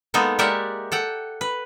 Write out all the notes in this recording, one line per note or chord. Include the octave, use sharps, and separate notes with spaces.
G#3 A#3 B3 D#4 A4
G#3 G4 A#4 D5 E5 F#5
A4 F#5 G5
B4